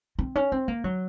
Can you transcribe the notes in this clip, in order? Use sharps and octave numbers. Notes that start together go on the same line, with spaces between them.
C4
C#4
C4
A#3
F#3